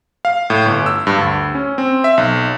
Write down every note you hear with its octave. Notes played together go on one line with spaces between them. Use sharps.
F5
A2
G1
E6
G2
D2
C#4
C4
E5
B1